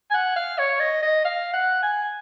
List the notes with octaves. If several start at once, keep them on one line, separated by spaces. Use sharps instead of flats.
G#5
F#5
F5
C#5
D#5
D#5
F5
F#5
G#5